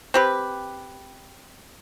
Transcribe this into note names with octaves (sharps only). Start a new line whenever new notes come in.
C4 G4 B4